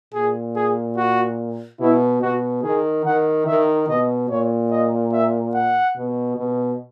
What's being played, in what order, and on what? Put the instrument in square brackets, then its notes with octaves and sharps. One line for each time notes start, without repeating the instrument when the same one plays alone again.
[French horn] A#2 [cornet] G#4
[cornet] G#4
F#4
[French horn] B2 [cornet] E4
[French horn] B2 [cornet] F#4
[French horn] D#3 [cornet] G#4
[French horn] D#3 [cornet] F#5
[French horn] D#3 [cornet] E5
[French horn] B2 [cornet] D#5
[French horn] A#2 [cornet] C#5
[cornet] D#5
E5
F#5
[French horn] B2
B2